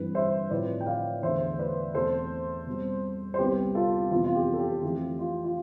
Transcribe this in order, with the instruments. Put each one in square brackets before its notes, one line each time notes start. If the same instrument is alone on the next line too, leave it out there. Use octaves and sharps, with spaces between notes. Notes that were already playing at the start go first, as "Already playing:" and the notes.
Already playing: [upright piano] G2 E3 G3 C4 B4
C5 E5
A2 F3 C4 B4 D5
G5
D5 F5
E2 D3 A3 C5 E5
B4 D5
E2 B2 A3 C4 A4 C5
B2 G3 C4
C5
C2 C3 G3 B3 G4 B4
F4 A4
F2 C3 E3 B3 F4
F4
G4
A4
G4
F2 E3 A3 C4 G4
F4
F4